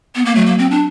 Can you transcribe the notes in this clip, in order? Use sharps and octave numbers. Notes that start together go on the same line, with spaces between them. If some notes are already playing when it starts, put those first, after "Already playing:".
B3
A#3
F#3 A3
A#3
C4
D4